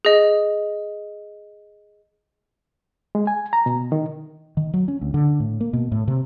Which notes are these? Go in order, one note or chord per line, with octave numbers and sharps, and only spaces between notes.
G#4 D#5
G#3
G#5
A#5
B2
D#3
D#3
F#3
C#4
D2
D3
A2
A#3
B2
A2
C3